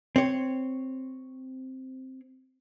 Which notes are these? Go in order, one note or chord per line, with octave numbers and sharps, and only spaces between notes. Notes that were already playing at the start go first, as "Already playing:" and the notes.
C4 C#5